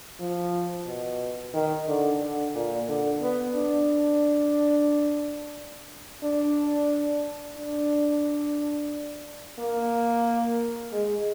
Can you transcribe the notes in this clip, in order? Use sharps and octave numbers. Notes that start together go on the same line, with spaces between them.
F3
B2
D#3
D3
D3
A#2
D3
B3
D4
D4
D4
A#3
G#3